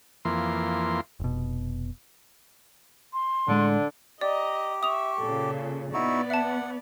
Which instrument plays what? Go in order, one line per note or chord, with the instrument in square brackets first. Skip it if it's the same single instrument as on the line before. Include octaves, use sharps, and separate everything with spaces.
[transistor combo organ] F2 E3 A#3 C6
[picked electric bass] F1 B2
[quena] C6
[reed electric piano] A2 G#3 [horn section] D3
[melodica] G4 [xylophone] D5 [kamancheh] D#5 A#5
[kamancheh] E5 C#6 [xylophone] D#6 F7
[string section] A#2 C#3 [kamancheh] A4
[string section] B3 [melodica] D#4 E4 F#4 [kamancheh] D5
[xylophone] E5 A5 [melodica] F#5